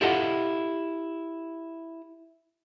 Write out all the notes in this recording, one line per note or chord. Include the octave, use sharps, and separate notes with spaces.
E4 F4 G4 A4 D#5 F#5